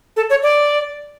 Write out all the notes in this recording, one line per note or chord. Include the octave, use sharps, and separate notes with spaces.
A4
C#5
D5